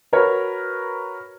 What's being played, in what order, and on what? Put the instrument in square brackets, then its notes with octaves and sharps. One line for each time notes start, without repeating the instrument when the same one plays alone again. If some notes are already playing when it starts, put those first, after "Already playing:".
[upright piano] F#4 A#4 B4 C#5